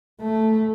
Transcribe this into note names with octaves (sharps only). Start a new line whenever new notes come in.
A3